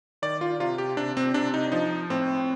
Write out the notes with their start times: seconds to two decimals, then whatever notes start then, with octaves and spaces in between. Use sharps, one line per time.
0.22 D#3 D5
0.41 F4
0.60 C3 F4
0.78 G4
0.97 C3 D4
1.17 C4
1.34 C3 D4
1.54 D#4
1.72 F3 D#4
2.10 A2 C4